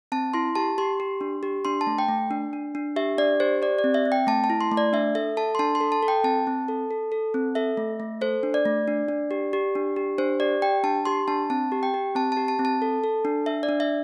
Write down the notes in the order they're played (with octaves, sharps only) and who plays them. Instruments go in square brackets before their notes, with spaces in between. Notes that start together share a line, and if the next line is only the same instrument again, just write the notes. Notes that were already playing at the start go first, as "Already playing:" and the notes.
[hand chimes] C4 A5
E4 C6
G4 A5
G4 C6
G4
D4
G4
D4 C6
A5
A3
G5
A3
D4
D4
D4
G4 E5
D4 D5
G4 C5
G4 D5
D5
C4
E5
C4
G5
A3 A5
A5
E4
C6
A3
D5
D4 E5
A4 E5
A4 A5
C6
D4 A5
C6
A4
A5
A4
G5
C4 A5
C4
A4
A4
A4
C4
A4 E5
A3
A3
A4 C5
D4
D5
A3
D4
D4
G4
G4
D4
G4
D4 C5
G4 D5
G4 G5
D4 A5
G4 C6
D4 A5
C4 A5
G4
G5
G4
C4 A5
G4 A5
A5
C4
A5
A4
A4
D4
D4 E5
D5
D4
E5